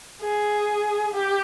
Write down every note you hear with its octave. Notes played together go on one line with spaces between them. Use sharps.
G#4
G4